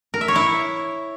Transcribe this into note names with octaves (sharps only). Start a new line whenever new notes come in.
A#4
E5
C#5
E4